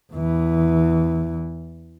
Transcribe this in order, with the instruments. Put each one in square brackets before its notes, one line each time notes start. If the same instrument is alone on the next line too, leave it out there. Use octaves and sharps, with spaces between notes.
[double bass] E2 E3